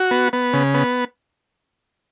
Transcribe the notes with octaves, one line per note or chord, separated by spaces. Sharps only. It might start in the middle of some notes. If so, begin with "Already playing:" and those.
Already playing: F#4
B3
B3
C#3
B3